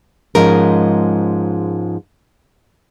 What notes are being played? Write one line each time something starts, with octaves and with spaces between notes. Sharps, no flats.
G#2 F3 G#3 C#4 A#4